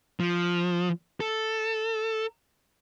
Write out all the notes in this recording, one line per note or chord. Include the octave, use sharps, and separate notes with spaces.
F3
A4